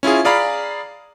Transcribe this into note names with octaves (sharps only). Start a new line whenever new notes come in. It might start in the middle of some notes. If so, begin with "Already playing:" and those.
C#4 E4 F4 G#4
G#4 D5 F5 A#5 B5